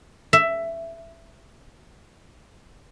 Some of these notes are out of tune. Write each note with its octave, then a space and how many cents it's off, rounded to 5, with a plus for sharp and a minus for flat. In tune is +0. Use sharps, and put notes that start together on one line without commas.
E5 +10